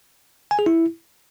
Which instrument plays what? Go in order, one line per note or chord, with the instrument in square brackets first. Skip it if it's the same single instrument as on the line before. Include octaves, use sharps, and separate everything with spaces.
[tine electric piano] G#5
G#4
E4